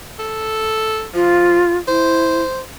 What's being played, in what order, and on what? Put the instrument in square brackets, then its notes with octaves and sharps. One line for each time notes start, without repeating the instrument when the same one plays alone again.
[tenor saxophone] A4
[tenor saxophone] F3 [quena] F4
[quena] E4 [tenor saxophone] C5